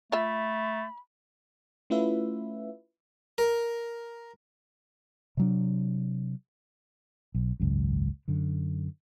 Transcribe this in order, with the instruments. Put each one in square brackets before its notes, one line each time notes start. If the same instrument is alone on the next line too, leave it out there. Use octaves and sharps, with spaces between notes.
[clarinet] A3 [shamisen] F4 E5 [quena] B5
[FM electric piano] A3 C#4 E4 F4 B4 E5
[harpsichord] A#4
[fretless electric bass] C3 F#3 D4
B1
G#1 C#2 F#2
F#2 D3